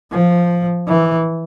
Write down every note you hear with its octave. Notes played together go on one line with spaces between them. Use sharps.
F3
E3